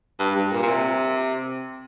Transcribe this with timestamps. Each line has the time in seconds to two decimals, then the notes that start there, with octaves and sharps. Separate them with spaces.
0.19 G2
0.35 G2
0.52 A#2
0.63 A#2
0.66 C3